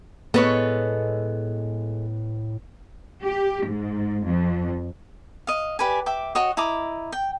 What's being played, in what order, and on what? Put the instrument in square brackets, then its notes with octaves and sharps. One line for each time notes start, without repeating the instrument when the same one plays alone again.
[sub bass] A2 [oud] G#3 [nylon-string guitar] B3 [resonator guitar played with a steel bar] A4 B4 C#5
[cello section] G4
G#2
F2
[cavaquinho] D#5 F5
G4 B4 D5 G#5
E5 G5 D6
F#4 C#5 D#5
E4 D#5 A#5 D6
G5